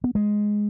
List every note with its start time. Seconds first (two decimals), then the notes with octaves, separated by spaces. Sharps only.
0.04 B3
0.15 G#3